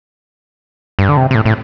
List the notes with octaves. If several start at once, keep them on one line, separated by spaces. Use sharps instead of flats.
G2
D3
C3
C3
A2
A2